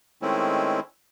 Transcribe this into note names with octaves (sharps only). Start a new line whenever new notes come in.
D#3 G#3 A3 C4 C#4 E4